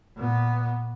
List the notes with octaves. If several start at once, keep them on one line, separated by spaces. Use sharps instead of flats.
A#2 B3